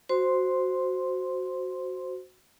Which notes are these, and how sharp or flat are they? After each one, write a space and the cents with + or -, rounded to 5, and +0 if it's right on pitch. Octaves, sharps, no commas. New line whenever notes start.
F#4 +0 C5 -5 C6 +0